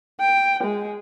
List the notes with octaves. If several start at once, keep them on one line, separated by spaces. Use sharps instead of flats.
G5
G#3